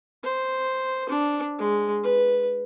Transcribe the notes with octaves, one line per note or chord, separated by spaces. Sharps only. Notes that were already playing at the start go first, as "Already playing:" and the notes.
C5
D4
G#3
B4